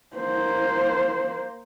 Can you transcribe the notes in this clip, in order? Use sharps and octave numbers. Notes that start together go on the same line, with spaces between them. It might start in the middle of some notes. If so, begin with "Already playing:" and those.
A#3 C5